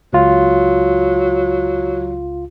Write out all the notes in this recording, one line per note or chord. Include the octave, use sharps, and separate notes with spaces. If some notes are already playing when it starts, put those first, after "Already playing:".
C#2 F#3 F4